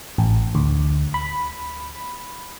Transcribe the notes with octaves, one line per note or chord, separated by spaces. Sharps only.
A1
D2
B5